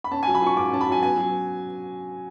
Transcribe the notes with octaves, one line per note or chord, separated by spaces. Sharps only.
B5
C#4 A5
G#5
F#3
B5
F4 C#6
G#2 D6
C#4 A5
B5
F#3 G#5
B3 G#5
F#3